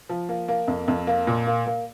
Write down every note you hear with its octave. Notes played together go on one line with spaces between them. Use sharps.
F3
A#3
A#3
F2
F2
A#3
A#2
A#3
A#3